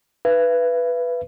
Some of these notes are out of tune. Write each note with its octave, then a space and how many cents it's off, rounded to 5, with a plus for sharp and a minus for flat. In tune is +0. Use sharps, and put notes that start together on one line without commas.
B4 +0 E5 +45